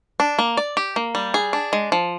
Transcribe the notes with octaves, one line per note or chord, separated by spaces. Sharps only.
D4
A#3
D5
G4
A#3
G3
G#4
D4
G#3
F3